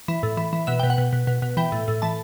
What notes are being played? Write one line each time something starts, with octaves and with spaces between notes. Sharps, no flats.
E3
A2
E3
E3
B2 E5
B2 G5
F#5
B2
B2
B2
B2
E3 G5
A2
A2
E3 A5